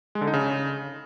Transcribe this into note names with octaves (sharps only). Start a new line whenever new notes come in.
G#3
D3
D#4
C#3